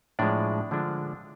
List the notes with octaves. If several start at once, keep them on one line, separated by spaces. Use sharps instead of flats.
A2 F3 G#3 D4 D5
D3 F3 G#3 D4 F4